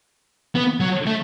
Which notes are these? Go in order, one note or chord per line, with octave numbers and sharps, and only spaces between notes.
B3
F#3
A3